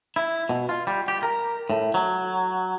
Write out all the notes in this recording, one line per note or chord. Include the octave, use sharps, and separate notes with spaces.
E4
B2
F4
G3
G4
A#4
A2
F#3